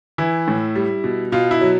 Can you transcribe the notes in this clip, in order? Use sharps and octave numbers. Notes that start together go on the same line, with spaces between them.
E3 E4
A2
G3
B2
B2 F4
E4
F#3